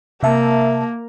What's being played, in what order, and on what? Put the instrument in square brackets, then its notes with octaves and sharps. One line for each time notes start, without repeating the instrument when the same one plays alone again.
[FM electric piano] C3 E5 A5 [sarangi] A#3